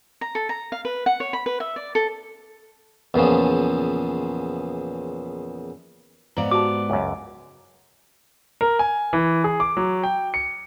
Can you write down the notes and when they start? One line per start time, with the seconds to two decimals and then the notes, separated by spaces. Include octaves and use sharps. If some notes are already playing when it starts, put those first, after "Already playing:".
0.21 A#5
0.35 A4
0.49 A#5
0.72 F5
0.85 B4
1.06 F#5
1.20 C#5
1.33 B5
1.46 B4
1.60 E5
1.76 D5
1.95 A4
3.14 E2 A#2 C#3 F3
6.37 G#2 B3 D5 F5 A#5
6.51 F#4 G4 A5 D6
6.90 C#2 F#2
8.61 A#4
8.79 G#5
9.13 E3
9.44 G#4
9.60 D6
9.77 F#3
10.03 G5
10.34 C#7